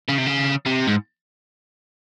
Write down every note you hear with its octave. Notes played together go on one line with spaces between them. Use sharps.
C#3
C3
C#3
C3
G#2